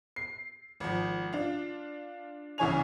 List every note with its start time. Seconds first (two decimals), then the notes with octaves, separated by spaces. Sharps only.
0.16 C7
0.80 G#1 F3
1.33 D4 F4
2.58 C2 C#3 E3 C#5 G#5 F7